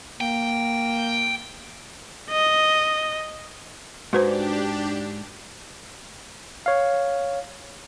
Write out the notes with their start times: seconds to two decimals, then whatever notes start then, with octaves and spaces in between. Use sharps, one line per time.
0.21 A#3 G5
2.30 D#5
4.13 G#2 D4 F#4 G4 B4 C5
6.66 C#5 F5